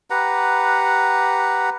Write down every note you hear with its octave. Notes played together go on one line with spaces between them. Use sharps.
G4 B4 F#5 A#5